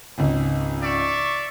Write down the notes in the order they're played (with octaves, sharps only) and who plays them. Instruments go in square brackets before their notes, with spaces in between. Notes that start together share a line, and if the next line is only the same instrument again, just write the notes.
[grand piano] G#1 C#2
[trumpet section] D5 E5 C#6